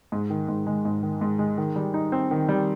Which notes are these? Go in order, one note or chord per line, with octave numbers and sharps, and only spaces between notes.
G#2
D#3
G#2
G#3
G#2
D#3
G#2
G#3
D#3
G3
D#4
C4
D#3
G3